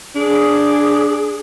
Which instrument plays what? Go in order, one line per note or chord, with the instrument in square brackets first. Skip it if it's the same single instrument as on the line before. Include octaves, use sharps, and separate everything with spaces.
[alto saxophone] D4 [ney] G#4